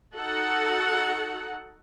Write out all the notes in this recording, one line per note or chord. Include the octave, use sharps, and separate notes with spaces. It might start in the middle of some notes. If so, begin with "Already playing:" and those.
D#4 F#4 A4 F#5